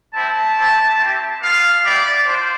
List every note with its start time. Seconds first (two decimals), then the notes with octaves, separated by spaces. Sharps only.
0.13 G3 C4 E4 A5
0.56 A3 C4 E4 G4
0.99 C4 E4 G4
1.40 B3 F4 F5
1.83 G3 B3 E4 G4 D5
2.25 D4 F4 C5